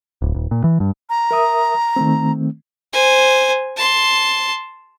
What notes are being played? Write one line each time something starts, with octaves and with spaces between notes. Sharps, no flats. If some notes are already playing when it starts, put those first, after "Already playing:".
D1
D#1
A#2
E3
G2
A#5
A#4 E5 D#6
D#3 A3 C4
C5 G#5
A5 C6